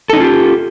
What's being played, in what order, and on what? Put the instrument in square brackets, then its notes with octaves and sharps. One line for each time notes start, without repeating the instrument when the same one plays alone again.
[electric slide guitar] A4
D#4
C#4
F4
G4